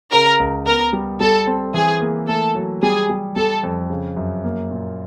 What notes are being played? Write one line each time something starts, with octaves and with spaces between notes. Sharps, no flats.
C#3 A#4
C#2
B3 A#4
G3
G3 A4
C4
E3 G#4
A#3
A3 A4
F#3
G3 G#4
G3
G3 A4
F2
C#3
F#2
A#3
A#2